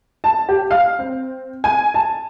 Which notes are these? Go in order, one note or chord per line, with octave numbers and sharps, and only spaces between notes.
A5
G4
F5
C4
G#5
A5